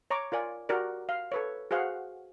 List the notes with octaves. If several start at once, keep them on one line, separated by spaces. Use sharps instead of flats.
C#5 A#5 C#6 D6
F4 A#4 D5 G#5
F#4 G4 A#4 D5
F5
A4 B4 C#5
F#4 G#4 C5 F5 F#5